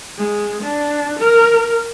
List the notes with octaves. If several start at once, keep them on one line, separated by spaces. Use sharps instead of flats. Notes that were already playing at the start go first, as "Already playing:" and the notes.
G#3
D4
A#4